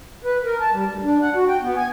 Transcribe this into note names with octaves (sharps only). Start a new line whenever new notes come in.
B4
A#4
A5
G3
D2
D4
F#5
F#4
G5
B3
G#5